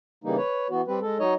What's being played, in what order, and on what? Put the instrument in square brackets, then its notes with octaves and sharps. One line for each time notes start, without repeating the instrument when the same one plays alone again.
[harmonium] C#3 E3 G3 A#3 D#4
B4 C#5
E3 B3 F#4
G3 C4 B4
G#3 A4
F#3 D#4 C#5 D#5